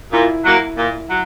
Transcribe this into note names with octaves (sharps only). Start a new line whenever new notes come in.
A#2 E4
F#3 A#3
A#2
F#3